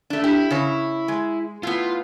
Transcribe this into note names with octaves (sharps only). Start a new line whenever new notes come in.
A3 D4
E4 G4
C#3 C#5
G#3
A2 B3 F4